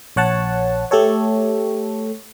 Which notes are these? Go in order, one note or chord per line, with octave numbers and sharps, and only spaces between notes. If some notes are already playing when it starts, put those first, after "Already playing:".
A#1 C#5 F#5 A5
A3 G4 A4 C#5